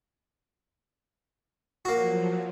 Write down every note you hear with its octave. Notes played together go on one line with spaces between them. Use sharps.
F3 F#3 A#3 F#4